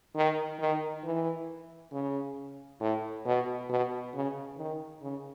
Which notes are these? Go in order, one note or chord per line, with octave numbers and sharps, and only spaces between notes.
D#3
D#3
E3
C#3
A2
B2
B2
C#3
D#3
C#3